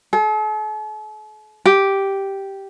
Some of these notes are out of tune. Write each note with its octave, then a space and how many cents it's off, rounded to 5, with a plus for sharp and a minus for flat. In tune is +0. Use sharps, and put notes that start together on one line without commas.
A4 -45
G4 -5